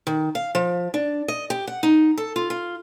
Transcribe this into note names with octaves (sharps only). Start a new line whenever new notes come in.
D#3
F5
F3
D4
D#5
G4
F#5
D#4
A4
F4
F4